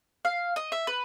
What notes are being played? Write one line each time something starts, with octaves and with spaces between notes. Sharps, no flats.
F5
D#5
E5
B4